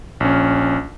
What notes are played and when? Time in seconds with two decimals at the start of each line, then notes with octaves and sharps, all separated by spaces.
0.20 A#1 C#4